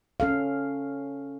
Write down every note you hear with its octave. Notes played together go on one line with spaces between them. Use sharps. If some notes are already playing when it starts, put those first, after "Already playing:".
C#4 A4 F5